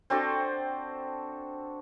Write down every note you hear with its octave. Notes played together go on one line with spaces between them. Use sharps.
C4 D4 F#4 A4